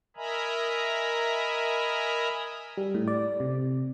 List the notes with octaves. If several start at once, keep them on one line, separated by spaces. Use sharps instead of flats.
A#4 D#5 E5 G#5 A#5 B5
G3
A2
D5
C3